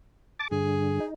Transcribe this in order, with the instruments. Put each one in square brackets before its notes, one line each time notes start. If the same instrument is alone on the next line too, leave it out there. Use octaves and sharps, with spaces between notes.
[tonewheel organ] A5 D6 A6
[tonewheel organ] G2 D3 [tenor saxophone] G#4
[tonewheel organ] D#4